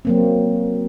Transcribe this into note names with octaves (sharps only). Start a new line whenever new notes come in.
F#3 A#3 C4